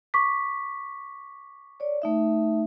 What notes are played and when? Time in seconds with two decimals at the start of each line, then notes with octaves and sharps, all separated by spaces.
0.14 C#6 D6 B6
1.80 C#5 D5
2.02 A3 D#4 E5